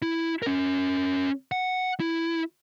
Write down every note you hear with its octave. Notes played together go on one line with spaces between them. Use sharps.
E4
C#4 A#4
F#5
E4